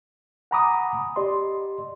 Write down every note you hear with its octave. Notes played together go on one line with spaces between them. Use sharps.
F#5 G#5 A#5 B5 D6 D#6
G4 D5 D#5 C6